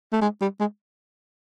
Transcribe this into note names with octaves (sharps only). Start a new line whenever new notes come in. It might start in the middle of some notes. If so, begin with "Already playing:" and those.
A3
G#3
G3
G#3